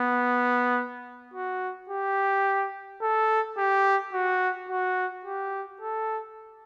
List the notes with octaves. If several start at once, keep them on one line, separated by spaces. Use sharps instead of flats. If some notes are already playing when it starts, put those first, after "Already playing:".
Already playing: B3
F#4
G4
A4
G4
F#4
F#4
G4
A4